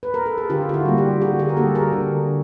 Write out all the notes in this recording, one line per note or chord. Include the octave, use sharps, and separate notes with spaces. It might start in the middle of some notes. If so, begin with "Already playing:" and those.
B4
A#4
A4
G#4
D3 F4 G4
F4
E4 F#4
G3 A#3
F4 G4
D3 F#4 G#4
F#4 G#4
A#4
G3 A#3 G4 A4
G#4 A#4
D3